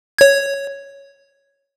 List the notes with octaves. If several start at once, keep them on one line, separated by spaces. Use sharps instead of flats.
C#5 G#6